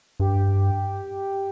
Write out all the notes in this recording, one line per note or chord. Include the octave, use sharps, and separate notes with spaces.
G2 G4